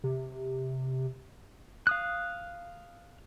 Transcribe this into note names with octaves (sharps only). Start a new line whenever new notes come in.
C3
F5 D#6 F#6